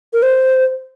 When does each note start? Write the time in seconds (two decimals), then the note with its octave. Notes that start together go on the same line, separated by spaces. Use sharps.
0.13 A#4
0.22 C5